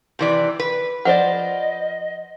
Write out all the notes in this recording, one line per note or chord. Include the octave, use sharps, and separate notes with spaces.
C3 E3 D5
B4
F3 C5 D5 D#5 F#5